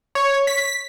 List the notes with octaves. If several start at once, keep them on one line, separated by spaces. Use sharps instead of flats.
C#5
B6